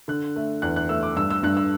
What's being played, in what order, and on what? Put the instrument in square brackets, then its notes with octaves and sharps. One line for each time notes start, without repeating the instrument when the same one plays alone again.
[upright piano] D3 F#6
A3
E2 F#6
F#6
A3 E6
D6
G2 E6
E6
G2 F#6
E6